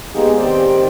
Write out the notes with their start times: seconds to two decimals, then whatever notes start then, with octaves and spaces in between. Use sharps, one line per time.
0.14 G#3 A#3 B3 D#4 G4 G#4
0.37 D#3 C4 G4 C5 D5 G5